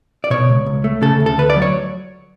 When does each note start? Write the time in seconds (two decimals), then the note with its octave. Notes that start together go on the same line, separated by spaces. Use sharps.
0.24 D5
0.30 B2 C#5
0.49 C#2
0.66 C#2
0.84 A3
1.02 C#3 A4
1.20 D2
1.26 A4
1.38 D2 B4
1.50 D5
1.56 F#3
1.62 C#5